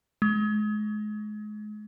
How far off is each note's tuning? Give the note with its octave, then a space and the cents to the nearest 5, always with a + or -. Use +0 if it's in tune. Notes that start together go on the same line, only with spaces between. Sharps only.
G#3 +35